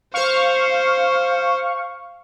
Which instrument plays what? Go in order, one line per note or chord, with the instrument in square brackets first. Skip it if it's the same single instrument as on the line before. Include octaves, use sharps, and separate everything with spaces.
[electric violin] C5 [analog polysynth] F5 C#6